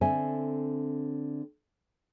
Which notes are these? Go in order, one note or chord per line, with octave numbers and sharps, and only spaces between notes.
D3 C4 A4 E5 G#5